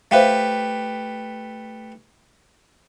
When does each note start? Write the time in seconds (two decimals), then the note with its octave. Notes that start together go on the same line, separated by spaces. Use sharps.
0.11 A3 G4 B4 C5 E5 F5